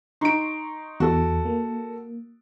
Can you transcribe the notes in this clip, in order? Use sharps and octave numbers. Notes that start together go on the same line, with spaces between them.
D#4 C6 C#6 D7
E2 F#4 A4
A#3